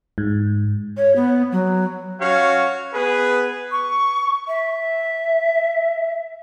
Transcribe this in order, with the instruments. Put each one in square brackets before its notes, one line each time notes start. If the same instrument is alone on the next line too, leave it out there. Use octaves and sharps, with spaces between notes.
[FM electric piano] G#2
[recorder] C#5
B3
F#3
[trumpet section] C#4 F#4 C#5 F5
B3 G#4 B4
[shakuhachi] C#6
E5